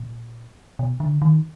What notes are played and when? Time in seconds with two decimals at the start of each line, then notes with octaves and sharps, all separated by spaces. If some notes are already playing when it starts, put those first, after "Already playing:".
Already playing: A#2
0.79 B2
1.00 D3
1.22 D#3